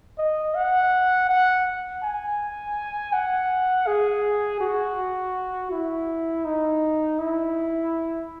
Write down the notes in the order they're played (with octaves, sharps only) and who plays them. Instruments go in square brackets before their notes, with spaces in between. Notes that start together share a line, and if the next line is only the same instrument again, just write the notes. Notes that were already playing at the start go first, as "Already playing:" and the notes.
[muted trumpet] D#5
F#5
F#5
G#5
F#5
G#4
F#4
E4
D#4
E4